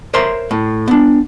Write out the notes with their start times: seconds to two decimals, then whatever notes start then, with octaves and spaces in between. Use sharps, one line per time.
0.14 A#4 C5 C#5 E5 A#5 C6
0.51 A2
0.88 B3 D4